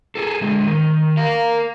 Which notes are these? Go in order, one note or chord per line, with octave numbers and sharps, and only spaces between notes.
G#4 A4
D3 G#3
D#3
A#4 F5